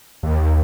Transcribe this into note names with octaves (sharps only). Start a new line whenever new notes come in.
D#2